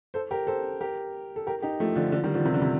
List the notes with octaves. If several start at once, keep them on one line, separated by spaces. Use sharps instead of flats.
A4 C5
G4 A#4
A4 C5
G4 A#4
A4
G4 A#4
D#4 G4
F3 A3
D3 F3
D3 F3
D#3 G3
D3 F3
C3 D#3
D3
C3